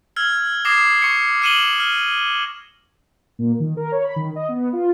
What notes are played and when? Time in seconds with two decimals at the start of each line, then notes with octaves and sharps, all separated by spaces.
0.16 E6 F6 G#6
0.65 D6 D#6 G#6 A#6 C7 E7
1.02 C#6 C#7
1.42 F6 C#7 D#7 E7 F#7 G7
1.80 F6
3.39 A#2
3.60 D#3
3.77 A#4
3.92 C#5
4.04 B5
4.16 D#3
4.36 D#5
4.48 B3
4.73 F4